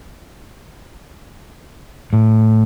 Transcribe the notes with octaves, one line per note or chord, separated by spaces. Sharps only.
A2